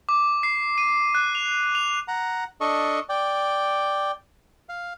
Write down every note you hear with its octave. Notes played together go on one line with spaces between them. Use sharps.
D6
C7
D#7
F#6
F7
F7
F#5 A#5
D4 A4 D#5 C#6
D5 G5
F5